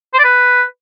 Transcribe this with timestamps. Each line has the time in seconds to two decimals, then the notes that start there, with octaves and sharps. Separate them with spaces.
0.14 C5
0.19 D5
0.24 B4